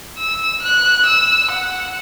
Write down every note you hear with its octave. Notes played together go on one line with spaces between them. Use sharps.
E6
F#6
E6
F#5